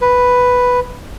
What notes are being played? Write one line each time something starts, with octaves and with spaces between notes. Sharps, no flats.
B4